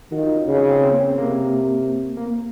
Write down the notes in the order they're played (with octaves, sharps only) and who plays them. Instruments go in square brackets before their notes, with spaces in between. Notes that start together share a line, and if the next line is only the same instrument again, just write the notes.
[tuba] D#3 [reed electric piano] F#4
[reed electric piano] F4
D#4
C#4
[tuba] C#3
[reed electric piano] C4
C4
C4
A#3
C#4
C4
[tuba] C3 [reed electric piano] A#3
[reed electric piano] A#3
C4